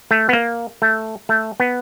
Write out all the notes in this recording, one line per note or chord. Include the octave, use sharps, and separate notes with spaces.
A3
B3
A#3
A3
A3
B3